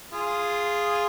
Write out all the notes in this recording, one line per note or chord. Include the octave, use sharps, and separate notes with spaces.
F4 G#4